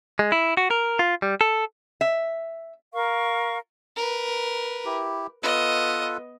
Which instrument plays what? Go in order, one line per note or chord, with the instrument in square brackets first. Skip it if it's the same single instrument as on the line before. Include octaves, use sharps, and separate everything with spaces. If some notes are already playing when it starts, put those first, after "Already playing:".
[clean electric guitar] G#3
E4
F#4
A#4
F4
G3
A4
[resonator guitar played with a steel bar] E5
[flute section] A#4 F5 C#6
[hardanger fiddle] A#4 B4
[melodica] E4 G4
[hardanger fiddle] B3 D#5 [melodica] F4 A4 B4